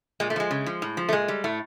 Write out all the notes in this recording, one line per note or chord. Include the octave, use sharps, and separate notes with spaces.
A#2 G#3
A3
F3 G#3
C#3
F3
A2
F3
A3
A#2 G#3
G3
A2 A3